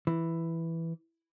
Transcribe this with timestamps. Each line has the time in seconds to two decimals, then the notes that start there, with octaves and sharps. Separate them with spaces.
0.07 E3